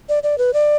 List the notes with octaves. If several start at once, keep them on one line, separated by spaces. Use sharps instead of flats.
D5
D5
B4
D5